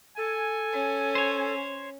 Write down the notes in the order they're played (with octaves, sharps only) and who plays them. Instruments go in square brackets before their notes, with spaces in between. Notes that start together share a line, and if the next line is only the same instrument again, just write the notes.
[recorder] A4 [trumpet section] G#5
[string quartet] C#4
[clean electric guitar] C5 C#5